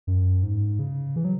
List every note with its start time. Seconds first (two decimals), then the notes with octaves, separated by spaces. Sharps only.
0.07 F#2
0.43 G#2
0.79 C#3
1.16 E3
1.25 F#3